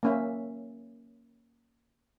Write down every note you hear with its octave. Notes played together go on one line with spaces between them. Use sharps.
A#3 C#4 E5